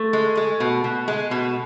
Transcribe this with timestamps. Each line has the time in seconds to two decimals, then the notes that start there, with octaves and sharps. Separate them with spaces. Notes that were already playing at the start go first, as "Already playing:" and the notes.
Already playing: A3
0.13 G#3
0.37 G#3
0.60 B2
0.84 B2
1.08 G#3
1.31 B2